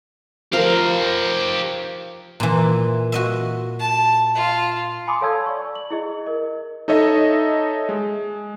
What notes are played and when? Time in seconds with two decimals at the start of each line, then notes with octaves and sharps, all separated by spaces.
0.53 F3 G4 A#4 F5
2.40 A#2 E3
3.12 F#4 D#5 E5
3.79 A5
4.35 F4
5.07 G#5 B5 C6 D6 D#6
5.21 A4 C#5 F5 A5 E6 G#6
5.46 D5 C#6
5.75 F#7
5.90 E4 G#4 D#5
6.26 A#4 D#5
6.88 D#4 A4 C#5 D#5 E5
7.89 G#3